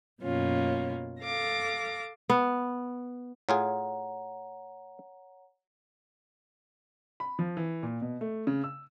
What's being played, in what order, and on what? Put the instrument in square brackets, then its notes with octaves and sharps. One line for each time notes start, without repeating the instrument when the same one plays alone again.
[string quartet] F#2 B2 A#3 C#4 F4
A4 F5 D6 A#6
[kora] B3
[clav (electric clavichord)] A2 F4 G#4 [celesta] C#5 F#5 A#5
[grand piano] B5
F3
E3
A#2
B2
A3
C#3
E6